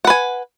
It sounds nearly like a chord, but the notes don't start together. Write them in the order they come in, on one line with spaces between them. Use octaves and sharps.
F#5 B4 G#5